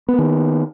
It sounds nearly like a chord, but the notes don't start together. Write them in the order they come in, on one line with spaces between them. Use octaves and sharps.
B3 A#3 D#3